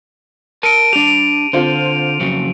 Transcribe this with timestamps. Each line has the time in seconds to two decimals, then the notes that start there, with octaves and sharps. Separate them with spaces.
0.63 A#4 A5 D7 D#7
0.93 D4 G4 F7
1.07 D7
1.53 D3 C4 F4 C5
2.20 F2 C#3 F#3